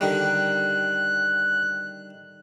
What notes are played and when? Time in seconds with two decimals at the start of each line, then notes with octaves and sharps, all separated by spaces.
0.01 D3 D#3 G3 F#6